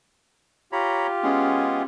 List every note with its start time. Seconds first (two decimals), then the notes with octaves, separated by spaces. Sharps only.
0.72 F4 G4 C#5 A#5 B5
1.23 G#3 B3 C#4 G#4